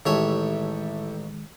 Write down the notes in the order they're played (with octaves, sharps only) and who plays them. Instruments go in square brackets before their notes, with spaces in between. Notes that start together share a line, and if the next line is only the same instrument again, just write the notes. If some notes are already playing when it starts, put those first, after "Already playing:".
[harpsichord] A1 C#5 E5 [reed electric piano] D#3 G#3 [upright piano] E4 G4 A4